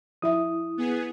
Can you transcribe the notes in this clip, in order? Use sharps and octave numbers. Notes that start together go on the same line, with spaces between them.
F3 E4 E5 D#6
B3 G#4